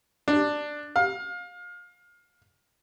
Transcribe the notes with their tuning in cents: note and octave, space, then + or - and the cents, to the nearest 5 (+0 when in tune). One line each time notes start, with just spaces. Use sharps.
D4 +10
F5 +25